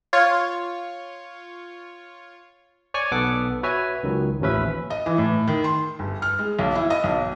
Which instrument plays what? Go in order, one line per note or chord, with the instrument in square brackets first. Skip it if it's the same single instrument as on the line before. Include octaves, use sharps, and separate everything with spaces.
[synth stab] F4 C#5
[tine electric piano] C#5 D5 G#5 C#6
B1 B3 A4 F#5 D6
F#4 B4 C#5 E5 G#5
C#2 D#3 F#3
A1 D#2 F3 C#4 B4 E5
[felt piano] D#5
E3
A2
D#3
C6
G1
F6
G#3
B1
E4
D#5
B1